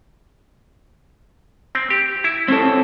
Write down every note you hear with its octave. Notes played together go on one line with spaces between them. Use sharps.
C4
G4
E4
C4 C#4 A4